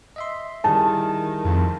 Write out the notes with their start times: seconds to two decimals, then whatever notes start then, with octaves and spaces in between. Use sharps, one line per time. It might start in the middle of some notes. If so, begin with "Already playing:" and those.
0.16 D#5 E5 C6
0.64 D#3 G3 E4 G#4 A5
1.45 F2